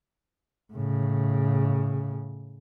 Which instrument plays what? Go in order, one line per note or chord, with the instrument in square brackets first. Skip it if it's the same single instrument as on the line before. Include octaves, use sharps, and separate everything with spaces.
[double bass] A2 C#3